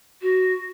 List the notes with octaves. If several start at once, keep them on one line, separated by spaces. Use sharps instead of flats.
F#4